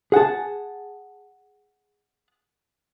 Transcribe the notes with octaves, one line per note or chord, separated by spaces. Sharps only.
G#4 F#5 G5 A5